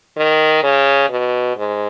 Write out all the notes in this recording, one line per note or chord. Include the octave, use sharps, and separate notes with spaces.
D#3
C#3
B2
G#2